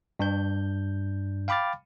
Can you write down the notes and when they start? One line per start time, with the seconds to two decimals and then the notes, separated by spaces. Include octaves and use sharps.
0.19 G2 D4 G6
1.48 F5 G5 B5 D6 F6 A6